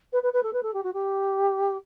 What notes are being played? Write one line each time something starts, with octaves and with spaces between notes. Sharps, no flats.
B4
B4
B4
A4
B4
A4
G4
F#4
G4